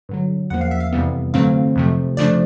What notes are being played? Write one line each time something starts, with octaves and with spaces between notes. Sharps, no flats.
G2 D3 F#3
E2 C#3 F3 A#3 F#5
F5
E5
F5
F2 C3 E3 G3 B3
G2 D3 F#3 A3 C4 F5
F2 C3 F3 A3
C#3 F3 A3 D4 D5